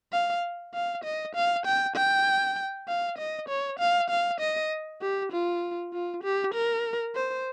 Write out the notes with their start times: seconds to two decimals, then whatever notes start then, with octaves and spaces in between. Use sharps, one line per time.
0.13 F5
0.74 F5
1.04 D#5
1.35 F5
1.65 G5
1.96 G5
2.88 F5
3.18 D#5
3.48 C#5
3.79 F5
4.10 F5
4.40 D#5
5.01 G4
5.32 F4
5.93 F4
6.23 G4
6.54 A#4
7.15 C5